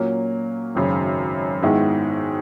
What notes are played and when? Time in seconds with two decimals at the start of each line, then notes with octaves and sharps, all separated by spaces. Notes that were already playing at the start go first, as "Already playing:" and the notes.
Already playing: A#2 F#3 A#3 C#4
0.75 G#1 F#2 C#3
1.63 G#2 D#3 G#3 B3 E4